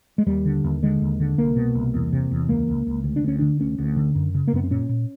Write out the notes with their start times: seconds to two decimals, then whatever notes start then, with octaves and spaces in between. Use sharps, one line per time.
0.18 G#3
0.26 D#2 G3
0.45 D3
0.64 D#2
0.83 D3 G#3
1.01 D#2
1.20 D3
1.38 C2 A#3
1.56 B2
1.75 C2
1.94 E2
2.13 C3
2.31 E2
2.49 C#2 A#3
2.68 C#2
2.87 C#2
3.04 D2
3.16 D4
3.23 D2 C#4
3.39 D3 D4
3.60 D2 C#4
3.79 D2
3.97 D3
4.15 F#2
4.35 C#3
4.48 A#3
4.53 F#2 B3
4.64 C4
4.71 A#2 C#4
4.89 A#2